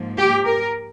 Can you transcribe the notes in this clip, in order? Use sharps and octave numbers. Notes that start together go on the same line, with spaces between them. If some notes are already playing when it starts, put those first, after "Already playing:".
Already playing: G#2 F3 A#3
G4
A#4